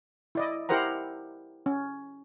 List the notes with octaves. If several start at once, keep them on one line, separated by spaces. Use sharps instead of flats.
E4 D5 D#5
E4 G4 A#4 C5 F#5 A#5
C#4